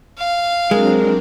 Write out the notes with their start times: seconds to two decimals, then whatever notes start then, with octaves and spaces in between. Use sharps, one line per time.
0.18 F5
0.71 F#3 G#3 C4 D4 A#4